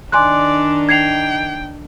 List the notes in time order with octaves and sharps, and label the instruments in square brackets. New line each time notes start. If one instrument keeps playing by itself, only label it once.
[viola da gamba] D#3 D4 D#4 [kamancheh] D5 [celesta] G#5 C6 F#6
[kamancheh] G5 [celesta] G#6 C7 F7